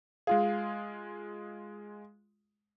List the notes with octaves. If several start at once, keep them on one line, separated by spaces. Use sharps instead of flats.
G#3 F4 G#4 F5